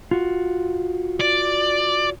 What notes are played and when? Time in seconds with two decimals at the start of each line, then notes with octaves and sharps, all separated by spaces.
0.11 F4 F#4
1.21 D5